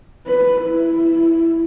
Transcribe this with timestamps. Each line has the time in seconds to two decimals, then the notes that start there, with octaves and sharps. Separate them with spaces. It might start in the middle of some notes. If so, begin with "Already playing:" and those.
0.27 B4
0.63 E4